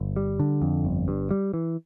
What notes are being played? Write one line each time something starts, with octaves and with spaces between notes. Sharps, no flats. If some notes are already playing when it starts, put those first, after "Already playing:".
Already playing: G1
G3
D3
F2
G1
G2
G3
E3